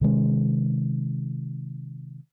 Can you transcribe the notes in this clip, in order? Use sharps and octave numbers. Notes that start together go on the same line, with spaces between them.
C3 D#3 G#3 C#4